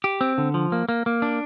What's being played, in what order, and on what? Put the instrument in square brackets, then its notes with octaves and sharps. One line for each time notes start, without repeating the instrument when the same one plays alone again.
[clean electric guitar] G4
C4
D3
F3
A#3
A#3
A#3
D4